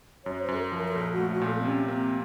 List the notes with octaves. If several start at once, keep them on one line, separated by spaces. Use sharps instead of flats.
F#2 C#5
C5
F#2
A4
A#4
F3
A#4
A#4
A#1 A4
F#4
A3
F#4
A#2
A4
C4
C3 C#4
A#3 C4